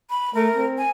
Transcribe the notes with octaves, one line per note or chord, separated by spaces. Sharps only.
B5
A3 A#4
C4
G#5